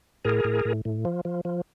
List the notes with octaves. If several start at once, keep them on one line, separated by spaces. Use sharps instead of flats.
A2 G#4 A#4
A2
A2
A2
F3
F3
F3